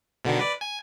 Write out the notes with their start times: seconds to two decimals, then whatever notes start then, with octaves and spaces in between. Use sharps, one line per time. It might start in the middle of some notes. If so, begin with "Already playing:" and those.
0.25 B2 D3 D#3
0.39 B4 D5
0.61 G#5